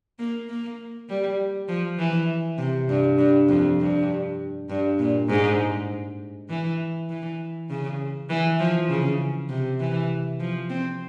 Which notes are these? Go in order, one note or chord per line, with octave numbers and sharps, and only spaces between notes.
A#3
A#3
G3
F3
E3
C3
G2
G2
F2
G2
G2
A#2
G#2
E3
E3
C#3
E3
F3
C#3
C3
E3
F3
C4